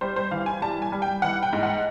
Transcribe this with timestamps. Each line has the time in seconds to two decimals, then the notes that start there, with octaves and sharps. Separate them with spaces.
0.01 G3 C5
0.16 C5
0.31 E3 F5
0.46 G#5
0.62 G3 A5
0.82 G#5
0.92 G3
1.02 G5
1.22 E3 F#5
1.43 G5
1.53 G#2
1.63 F#5